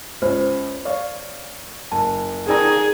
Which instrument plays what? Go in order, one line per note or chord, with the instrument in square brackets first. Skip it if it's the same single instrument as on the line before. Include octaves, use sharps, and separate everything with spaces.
[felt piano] C#2 C#4 [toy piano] C5
[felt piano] C#5 D5 F5
[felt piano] F#1 [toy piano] A5
[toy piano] D#4 A#4 [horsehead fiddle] G#4 [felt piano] D5 G5 A#5